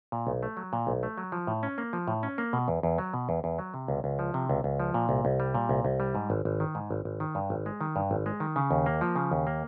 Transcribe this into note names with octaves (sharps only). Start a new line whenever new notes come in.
A#2
B1
A3
F#3
A#2
B1
A3
F#3
F3
A2
C#4
A#3
F3
A2
C#4
A#3
B2
E2
E2
F#3
B2
E2
E2
F#3
C3
C#2
C#2
F3
C3
C#2
C#2
F3
A#2
C2
C2
G3
A#2
C2
C2
G3
G#2
G#1
G#1
D#3
G#2
G#1
G#1
D#3
G2
G#1
G#3
D#3
G2
G#1
G#3
D#3
C#3
D#2
A#3
F3
C#3
D#2
A#3